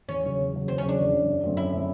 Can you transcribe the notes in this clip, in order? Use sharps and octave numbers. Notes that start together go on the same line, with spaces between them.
E2 C#4
C#3 F#3
E2
C#3 F#3
E2 C4
C#4
C#3 F#3
D4
E2
C#3 F#3
F#2
D3 F#3 A3 C4
F#2 E4
D3 F#3 A3 C4